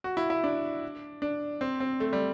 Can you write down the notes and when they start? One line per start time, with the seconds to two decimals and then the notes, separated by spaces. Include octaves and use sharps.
0.04 F#4
0.17 E4
0.30 E4
0.44 D4
1.22 D4
1.61 C4
1.80 C4
2.00 A3
2.13 G3